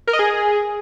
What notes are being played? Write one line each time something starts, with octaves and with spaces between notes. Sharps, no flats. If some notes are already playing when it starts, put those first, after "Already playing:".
A#4
D#5
G#4